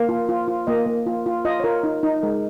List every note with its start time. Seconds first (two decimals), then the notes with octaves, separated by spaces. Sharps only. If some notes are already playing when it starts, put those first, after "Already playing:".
Already playing: A#3 F5
0.09 F4
0.29 F4
0.48 F4
0.67 A#3 D#5
0.86 A#3
1.06 F4
1.26 F4
1.45 F4 D#5
1.60 C#5
1.64 F4 A#4
1.83 D#4
2.03 D#4
2.22 G#3 A#4